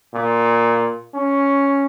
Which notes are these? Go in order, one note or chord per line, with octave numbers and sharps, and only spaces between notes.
A#2
C#4